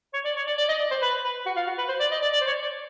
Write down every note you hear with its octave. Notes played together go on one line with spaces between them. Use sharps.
C#5
D5
C#5
D5
D5
D#5
D5
C5
B4
B4
F#4
F4
F#4
B4
C5
D5
D#5
D5
D5
C5
C#5
D5